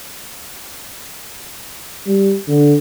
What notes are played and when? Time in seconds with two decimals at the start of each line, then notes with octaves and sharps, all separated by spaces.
2.06 G3
2.48 D3